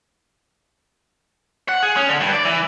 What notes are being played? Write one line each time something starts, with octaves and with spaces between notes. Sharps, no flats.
F#5
G#4
C#4
D3
G2
D5
E3